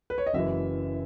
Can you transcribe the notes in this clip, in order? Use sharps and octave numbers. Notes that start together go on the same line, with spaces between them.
B4
C#5
D#5
F#1 F#2 E3 E5